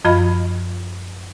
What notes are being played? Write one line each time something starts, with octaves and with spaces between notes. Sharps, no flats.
F#2 F3 F4 D#5 B5